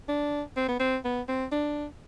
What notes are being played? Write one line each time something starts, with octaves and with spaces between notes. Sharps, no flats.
D4
C4
B3
C4
B3
C4
D4